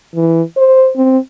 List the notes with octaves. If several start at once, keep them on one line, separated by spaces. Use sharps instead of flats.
E3
C5
C4